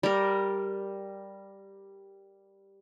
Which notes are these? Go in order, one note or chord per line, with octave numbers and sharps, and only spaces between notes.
G3 A#4